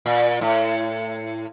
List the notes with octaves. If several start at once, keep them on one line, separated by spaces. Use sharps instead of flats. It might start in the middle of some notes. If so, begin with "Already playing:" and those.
A#2
A2